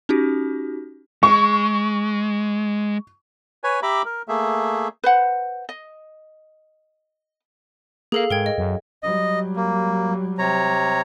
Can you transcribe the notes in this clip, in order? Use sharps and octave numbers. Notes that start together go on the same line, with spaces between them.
C#4 D#4 F#4 G4
G#3 C#6
B4 C#5 G#5
G4 E5 A#5 B5 D6
A#4
A3 A#3 G#4 E5
B4 C5 F#5
D#5
A#3 G#4 A4 F5
G#2 A#4 G5 G#6
D#5
F#2
F#3 G3 D#5
A#3
C3 C#5 A#5